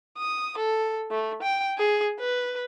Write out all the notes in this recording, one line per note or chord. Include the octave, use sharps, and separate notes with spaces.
D#6
A4
A3
G5
G#4
B4